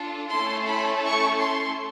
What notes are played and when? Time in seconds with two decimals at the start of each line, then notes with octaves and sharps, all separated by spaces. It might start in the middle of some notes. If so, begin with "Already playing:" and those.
Already playing: D4 F4 A4
0.30 A3 C#4 E4 A4 C6
0.67 B5
1.03 C#6
1.39 C6